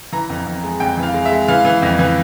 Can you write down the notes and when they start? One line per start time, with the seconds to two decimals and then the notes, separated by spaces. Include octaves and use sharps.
0.13 E3 A#5
0.30 F2
0.46 F2
0.64 G#3
0.80 F2 G5
0.98 E3
1.03 F5
1.14 G#3
1.25 E5
1.31 G#3
1.48 E3 F5
1.65 E3
1.82 F2
1.99 E3